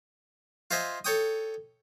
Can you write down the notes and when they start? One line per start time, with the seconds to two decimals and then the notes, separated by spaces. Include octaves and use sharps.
0.71 F4 C5 D#5 E5 G#5
1.05 A4 C#5 G5 D#6